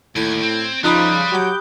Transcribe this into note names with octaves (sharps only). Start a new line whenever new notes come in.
D#2 A2 G#6
C4
C#3 F3 G3 D#4 F4 B5 D#6 F#6
F#3 G4 D6 G6